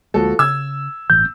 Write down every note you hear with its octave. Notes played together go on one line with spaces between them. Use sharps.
D2 F3 G#3 A#3 F#4 A4
C#3 E6 G#6
G1 A2 E3 G6